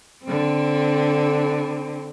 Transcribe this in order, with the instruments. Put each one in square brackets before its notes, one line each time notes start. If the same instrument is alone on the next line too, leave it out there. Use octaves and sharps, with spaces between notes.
[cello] D3 C4